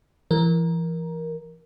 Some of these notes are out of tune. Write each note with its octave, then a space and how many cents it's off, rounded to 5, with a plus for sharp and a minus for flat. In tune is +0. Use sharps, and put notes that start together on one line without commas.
E3 +25 A#4 +10